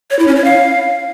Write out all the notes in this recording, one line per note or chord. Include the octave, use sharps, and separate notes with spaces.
C#5
E4
C#4
C#5
F5